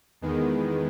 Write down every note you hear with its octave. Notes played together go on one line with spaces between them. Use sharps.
E2 D#3 G#3 B3